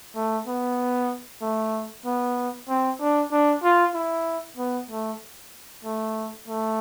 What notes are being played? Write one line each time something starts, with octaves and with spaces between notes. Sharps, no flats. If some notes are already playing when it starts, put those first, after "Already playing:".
A3
B3
A3
B3
C4
D4
D4
F4
E4
B3
A3
A3
A3